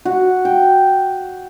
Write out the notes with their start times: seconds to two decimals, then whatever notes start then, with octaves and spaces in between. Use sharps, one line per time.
0.05 F#4
0.45 G5